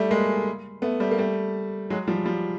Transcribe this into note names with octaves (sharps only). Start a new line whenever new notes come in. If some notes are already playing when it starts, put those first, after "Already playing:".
Already playing: G3 A3
G#3 A#3
A3 B3
G3 A3
A#3
G3 A3
F#3 G#3
F3 G3
F3 G3